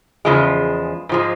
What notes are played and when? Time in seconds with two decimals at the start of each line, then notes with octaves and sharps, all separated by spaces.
0.25 E2 C#3 F3 G#3
1.09 G#2 F3 G#3